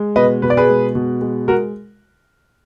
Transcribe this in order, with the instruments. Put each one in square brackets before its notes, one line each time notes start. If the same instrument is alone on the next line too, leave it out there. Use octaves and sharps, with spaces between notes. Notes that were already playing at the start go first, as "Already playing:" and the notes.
Already playing: [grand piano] G#3
B2 B4 D#5
B2 B4
D5
G#4 B4
G#3
B2
G#3
G#3 F#4 A#4